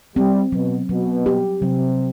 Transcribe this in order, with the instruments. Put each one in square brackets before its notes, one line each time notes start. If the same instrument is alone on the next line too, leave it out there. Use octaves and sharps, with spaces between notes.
[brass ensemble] G3 [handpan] C4
[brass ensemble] B2 [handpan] F#3
[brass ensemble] B2 [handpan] F#3
[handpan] G4
[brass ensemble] C3 [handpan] F#3